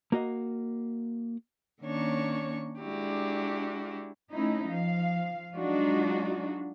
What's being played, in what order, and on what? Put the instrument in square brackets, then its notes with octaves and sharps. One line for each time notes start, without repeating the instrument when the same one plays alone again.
[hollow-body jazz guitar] A#3 F#4 D#5
[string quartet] D#3 A#3 C#4 D4 C#5 C#6
G#3 D4 E4 F#4 G4
[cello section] A3 C#4 D#4 E4
F3 F5
F#3 G#3 D4 D#4 F4 F#4